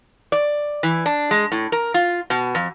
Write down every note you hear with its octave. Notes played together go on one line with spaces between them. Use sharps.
D5
E3
D4
G#3
A2
A#4
F4
B2
F2